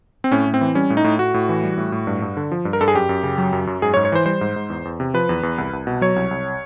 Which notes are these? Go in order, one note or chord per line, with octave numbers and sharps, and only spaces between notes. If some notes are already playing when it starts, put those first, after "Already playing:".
C4
A2 C#4
A2
C4
E3
G3 C#4
A2
D#4
A2
A2 F#4
A2
E3
G3
A2
A2
G2
G2
D3
F3
G2
A#4
G2 A4
G#4
F#2 G4
F#2
C#3
F#3
F#2
F#2
G#2 G#4
C#5
G#2
C#5
E3 C5
G3 C5
G#2
G#2
E2
E2
C3
F3 B4
E2
E2
C2
C2
B2
F#3 C#5
C2
C2